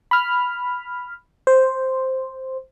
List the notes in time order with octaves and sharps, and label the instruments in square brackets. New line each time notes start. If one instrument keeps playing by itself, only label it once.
[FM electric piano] B5 F6
C5